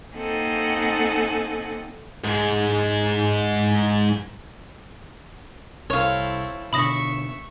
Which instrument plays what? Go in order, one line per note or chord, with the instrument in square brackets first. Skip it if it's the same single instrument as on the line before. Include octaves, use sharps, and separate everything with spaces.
[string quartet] A#3 C4 D#4 A4 F#5 G#5
[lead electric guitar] G#2 G#3
[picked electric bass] C2 [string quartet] C4 E4 A4 [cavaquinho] C#5 F5
[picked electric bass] B2 D3 [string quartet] E5 C#6 [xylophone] B5 D#6 A#6